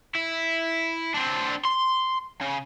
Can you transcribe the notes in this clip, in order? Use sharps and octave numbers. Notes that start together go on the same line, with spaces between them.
E4
C4 D4
C6
C#3